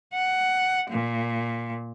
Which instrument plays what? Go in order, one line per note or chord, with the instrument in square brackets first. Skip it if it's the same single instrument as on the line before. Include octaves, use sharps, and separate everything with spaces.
[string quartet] F#5
A#2